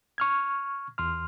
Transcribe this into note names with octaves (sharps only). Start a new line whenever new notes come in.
C#6 F6 G#6
E2 C6 F6